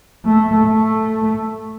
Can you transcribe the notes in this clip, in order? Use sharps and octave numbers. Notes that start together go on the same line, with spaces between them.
A3
A3